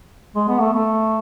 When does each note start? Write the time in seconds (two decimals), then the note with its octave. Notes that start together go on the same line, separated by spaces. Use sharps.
0.36 G#3
0.48 B3
0.61 A3
0.73 A3